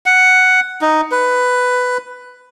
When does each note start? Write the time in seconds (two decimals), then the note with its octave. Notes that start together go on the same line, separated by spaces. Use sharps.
0.06 F#5
0.81 D#4
1.12 B4